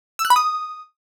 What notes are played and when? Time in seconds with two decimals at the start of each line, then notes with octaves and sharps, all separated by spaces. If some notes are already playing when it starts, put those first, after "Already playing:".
0.19 E6
0.25 F#6
0.30 B5
0.36 D#6